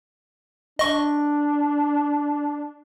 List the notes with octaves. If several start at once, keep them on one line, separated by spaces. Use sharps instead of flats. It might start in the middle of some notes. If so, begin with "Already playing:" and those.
D4 D#5 C#6